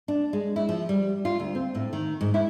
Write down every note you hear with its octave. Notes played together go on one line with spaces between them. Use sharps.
D4
G#3
E4
F3
G3
F4
D2
C4
A2
D#3
G#2
E4